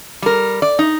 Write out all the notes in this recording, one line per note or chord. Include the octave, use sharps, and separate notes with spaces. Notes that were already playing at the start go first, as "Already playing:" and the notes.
G3 A#4
D5
D#4